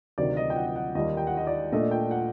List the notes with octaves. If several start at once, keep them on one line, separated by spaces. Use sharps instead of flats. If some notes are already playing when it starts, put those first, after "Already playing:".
D2 C3 D#3 F#3 D5
D#5
G5
F#5
D#5
F#5
D#2 D#3 G3 D#5
G5
F#5
D#5
D5
A#2 A3 D4 D#5
G5
F#5